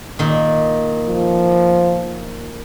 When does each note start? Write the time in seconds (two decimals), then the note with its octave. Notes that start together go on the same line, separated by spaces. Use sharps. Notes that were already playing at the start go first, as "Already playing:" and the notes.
0.19 A#2 D#3
1.07 F3